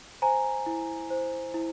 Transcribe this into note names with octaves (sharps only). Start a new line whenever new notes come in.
C5 G#5 A#5
E4
C5
E4